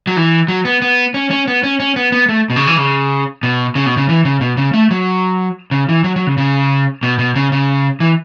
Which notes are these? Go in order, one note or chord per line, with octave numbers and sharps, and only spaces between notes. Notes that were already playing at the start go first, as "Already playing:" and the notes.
F#3
E3
F#3
B3
B3
C#4
C#4
B3
C#4
C#4
B3
B3
A3
B2
C#3
E3
C#3
B2
C#3
B2
C#3
E3
C#3
B2
C#3
A3
F#3
C#3
E3
F#3
F#3
C#3
C#3
B2
B2
C#3
C#3
E3